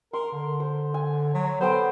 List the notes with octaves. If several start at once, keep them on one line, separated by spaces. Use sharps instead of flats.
A#4 C6
D3
C5
G#5
F#3
B3 A4 C5 G5